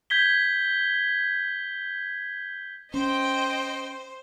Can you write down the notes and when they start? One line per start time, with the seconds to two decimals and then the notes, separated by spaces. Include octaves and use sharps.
0.10 G6 G#6 B6 G7
2.94 C#4 C5 D#5 G5